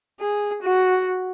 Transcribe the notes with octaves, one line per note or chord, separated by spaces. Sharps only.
G#4
F#4